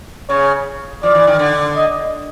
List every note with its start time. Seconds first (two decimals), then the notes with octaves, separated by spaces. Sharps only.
0.29 C#3 C#5
1.03 F3 D5
1.15 E3
1.27 D#3
1.39 D3
1.76 D#5